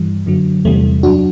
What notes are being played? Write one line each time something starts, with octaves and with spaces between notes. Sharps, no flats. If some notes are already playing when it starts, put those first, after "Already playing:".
Already playing: G2 E3 G3
F#2 D3 F#3
E2 C3 E3 G3 A3
F#2 F#3 D4 F#4